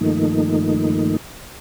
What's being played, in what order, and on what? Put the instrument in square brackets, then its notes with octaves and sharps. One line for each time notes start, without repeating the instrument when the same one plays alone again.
[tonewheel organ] G2 D#3 F3 A3 A#3 D#4